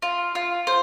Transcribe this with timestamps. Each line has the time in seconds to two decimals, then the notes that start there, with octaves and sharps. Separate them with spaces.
0.02 F4
0.35 F4
0.67 C5